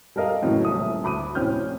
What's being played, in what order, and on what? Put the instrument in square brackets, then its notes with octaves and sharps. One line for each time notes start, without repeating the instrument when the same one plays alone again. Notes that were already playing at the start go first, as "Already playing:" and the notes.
[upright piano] G3 A4 A#4 D#5 F5
F#2 A2 C#3 E3 F#3
D#1 E5 D#6
D2 B5 D6 D#7
F1 A2 C4 C#4 F6 G6